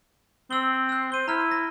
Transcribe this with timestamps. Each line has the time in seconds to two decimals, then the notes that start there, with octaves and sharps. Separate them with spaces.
0.51 C4 E6 F#7 G7
0.89 E6 F#6
1.12 C5 D#7 G7
1.28 E4 A#5 F6
1.51 A#6